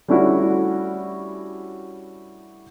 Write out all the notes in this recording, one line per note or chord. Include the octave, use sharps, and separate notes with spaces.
G3 A3 C#4 D4 E4 F#4